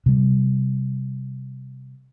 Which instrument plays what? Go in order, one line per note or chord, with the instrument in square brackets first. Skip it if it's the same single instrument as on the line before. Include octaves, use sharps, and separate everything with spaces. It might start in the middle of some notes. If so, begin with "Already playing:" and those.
[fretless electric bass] C3 G3